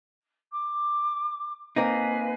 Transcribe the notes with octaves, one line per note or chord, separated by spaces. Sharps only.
D6
A#3 C4 D#4 B4 F5 G#5